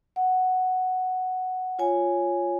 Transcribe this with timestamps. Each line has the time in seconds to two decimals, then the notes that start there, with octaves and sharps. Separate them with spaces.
0.16 F#5
1.79 F4 C#5 G#5